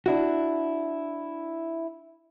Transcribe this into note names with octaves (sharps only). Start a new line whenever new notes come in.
D4 E4 F#4